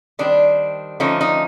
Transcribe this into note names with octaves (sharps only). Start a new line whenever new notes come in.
D#3 G3 C4 D4
D3 F3 A3 C#4 D#4
D#4